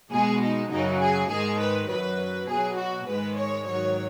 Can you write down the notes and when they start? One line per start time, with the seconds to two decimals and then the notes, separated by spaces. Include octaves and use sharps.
0.11 B2 G#3 G#4
0.41 D#4
0.71 F#2 C#3 F#3 D#4
1.01 G#4
1.30 G#2 D#3 G#3 G#4
1.60 B4
1.90 F#2 F#3 B4
2.48 B2 F#3 G#4
2.78 F#4
3.08 G#2 D#3 G#3 B4
3.37 C#5
3.67 G#2 D#3 F#3 C#5